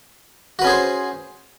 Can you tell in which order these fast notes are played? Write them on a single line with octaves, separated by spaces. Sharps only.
F#4 B4 C#4 G#4 C5